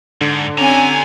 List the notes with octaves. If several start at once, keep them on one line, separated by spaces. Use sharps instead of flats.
G#2 D3
C4 C#4 G4 G#5 A#5